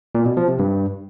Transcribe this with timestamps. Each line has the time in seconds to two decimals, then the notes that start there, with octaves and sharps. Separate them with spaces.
0.15 A#2
0.26 B2
0.37 F3
0.48 C3
0.59 G2